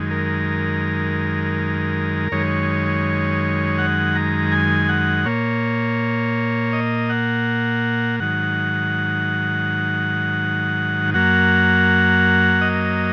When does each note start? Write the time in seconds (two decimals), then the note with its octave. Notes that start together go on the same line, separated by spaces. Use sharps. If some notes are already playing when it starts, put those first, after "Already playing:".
Already playing: F#2 D#3 G#3
0.11 A#4
2.32 F#2 D#3 G#3 C#5
3.78 F#5
4.16 A#5
4.52 G#5
4.89 F#5
5.26 A#2 A#3 C#5
6.73 D#5
7.10 F#5
8.20 G#2 D#3 F#3 F#5
11.14 F#2 F#3 A#3 F#5
12.61 D#5